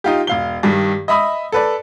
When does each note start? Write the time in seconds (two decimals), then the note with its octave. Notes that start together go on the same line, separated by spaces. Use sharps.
0.04 D#4 F4 G4
0.27 E1 F5 G7
0.63 G2 D#3 G3
1.08 D#5 E5 B5 D#6
1.52 A4 B4 D5